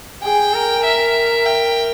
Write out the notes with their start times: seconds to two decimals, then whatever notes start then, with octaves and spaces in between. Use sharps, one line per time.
0.22 G#4 G5
0.53 A#4
0.84 E5
1.46 G5